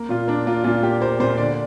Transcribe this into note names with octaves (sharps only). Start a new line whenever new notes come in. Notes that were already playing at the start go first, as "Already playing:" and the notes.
Already playing: A#3
A#2 F4
A#3 D4
A#3 F4
A#2 F4
A#3 G4
A#3 C5
A#2 C5
D3 D5